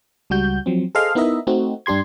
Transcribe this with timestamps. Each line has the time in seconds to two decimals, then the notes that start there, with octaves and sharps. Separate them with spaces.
0.30 C#2 G3 F#4 G6
0.66 F3 F#3 C4
0.95 G#4 A4 C5 D#5 F5 F6
1.15 B3 D#4 E4 A#4 D#5 E5
1.47 A3 C4 D#4 F#4
1.86 G2 D4 G4 C6 G#6